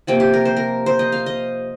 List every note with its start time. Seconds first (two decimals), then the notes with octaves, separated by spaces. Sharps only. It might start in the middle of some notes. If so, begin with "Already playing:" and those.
0.07 C3 F3 A#3 G5
0.20 G4
0.33 A#4
0.45 C5
0.57 A#4
0.86 C5
0.99 D#5
1.12 F5
1.26 D#5